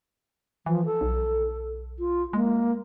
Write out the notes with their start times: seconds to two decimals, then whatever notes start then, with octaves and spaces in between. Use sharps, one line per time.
0.66 E3 F3
0.86 A4
1.01 B1
1.99 F4
2.33 G#3 A#3